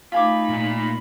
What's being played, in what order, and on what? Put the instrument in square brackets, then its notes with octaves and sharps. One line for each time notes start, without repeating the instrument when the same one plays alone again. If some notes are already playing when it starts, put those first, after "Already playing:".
[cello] A3 D#4 [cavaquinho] F4 G#5 D6 [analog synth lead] B5
[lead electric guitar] A#2